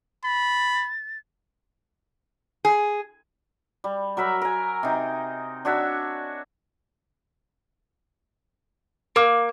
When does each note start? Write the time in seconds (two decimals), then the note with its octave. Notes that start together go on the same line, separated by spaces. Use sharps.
0.24 B5 A6
2.65 G#4
3.84 G3
4.17 F#3 A#4 E5 B5
4.42 A#4 G#5
4.83 C3 D#4
5.65 D4 F#4 C#5 E5
9.16 A#3 A#4 D6